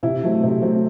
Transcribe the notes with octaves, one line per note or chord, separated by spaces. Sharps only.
C3 E4
F#3 A3 C4
C3
F#3 A3 C4